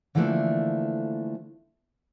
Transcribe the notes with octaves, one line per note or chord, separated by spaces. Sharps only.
D3 E3 F3 A3 A#3 D4